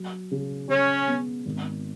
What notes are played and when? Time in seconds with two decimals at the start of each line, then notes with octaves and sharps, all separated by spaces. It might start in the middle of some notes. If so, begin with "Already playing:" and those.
Already playing: F#3
0.31 C#3
0.69 C#3 C#4
1.08 B3
1.46 G#1